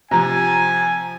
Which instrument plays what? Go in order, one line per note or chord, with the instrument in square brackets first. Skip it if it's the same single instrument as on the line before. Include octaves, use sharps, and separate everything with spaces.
[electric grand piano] C3 F3 [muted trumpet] G#5 [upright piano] A#5